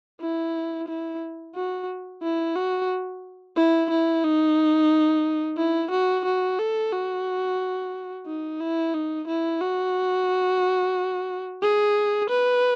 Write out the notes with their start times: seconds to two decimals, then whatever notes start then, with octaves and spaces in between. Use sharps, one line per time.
0.21 E4
0.88 E4
1.55 F#4
2.22 E4
2.56 F#4
3.56 E4
3.90 E4
4.24 D#4
5.57 E4
5.91 F#4
6.25 F#4
6.59 A4
6.92 F#4
8.26 D#4
8.60 E4
8.94 D#4
9.28 E4
9.61 F#4
11.62 G#4
12.30 B4